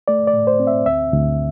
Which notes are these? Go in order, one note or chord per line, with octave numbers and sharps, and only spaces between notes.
A3 D5
D5
A2
C5
C4
E5
D2 E5
D2